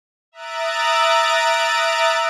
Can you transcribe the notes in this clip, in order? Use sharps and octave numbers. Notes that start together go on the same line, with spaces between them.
E5 A#5 D#6 F#6 A6 D7